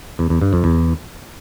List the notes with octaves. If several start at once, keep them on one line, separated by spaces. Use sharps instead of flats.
E2
E2
G2
F2
E2